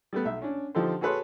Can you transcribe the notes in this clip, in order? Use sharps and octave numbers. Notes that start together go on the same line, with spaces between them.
G3 A3 B3
B1 E5
C#4 D4
D3 F3 D#4 G4 A4 C5
F#4 G#4 A4 B4 C#5 C6